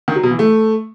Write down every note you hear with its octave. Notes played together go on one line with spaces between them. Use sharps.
D#3
F#3
B2
E3
A3